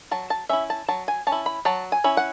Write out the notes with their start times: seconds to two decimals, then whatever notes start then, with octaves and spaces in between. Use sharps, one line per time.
0.11 F#3 A5
0.30 A5
0.49 C#4 E4 E5
0.70 A5
0.89 F#3 A5
1.08 G#5
1.27 C#4 A5
1.32 E4
1.46 B5
1.65 F#3 A5
1.92 G#5
2.04 C#4 E4
2.17 F#5